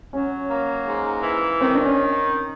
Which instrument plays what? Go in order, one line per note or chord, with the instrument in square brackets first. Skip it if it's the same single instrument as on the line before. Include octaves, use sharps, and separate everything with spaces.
[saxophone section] F#3 [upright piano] C#4
[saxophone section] A#3
G#2
E3
[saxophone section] D#3 [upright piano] C4
[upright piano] D4
C#4